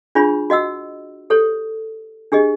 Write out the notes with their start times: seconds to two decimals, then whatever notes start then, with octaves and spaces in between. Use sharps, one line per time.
0.15 D4 F4 G#4 C#5 B5
0.50 F#4 D#5 F#5 E6
1.30 G4 A4 C5 C#5
2.32 D4 G4 G#4 D#5